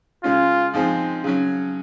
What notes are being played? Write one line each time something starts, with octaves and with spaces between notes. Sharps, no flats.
C#3 G#3 C#4 F4
G#2 F3 G#3 C4 D#4
C#3 F#3 C#4